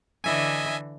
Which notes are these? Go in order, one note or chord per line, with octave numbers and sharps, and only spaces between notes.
D3 E3 D#5 E5 G#5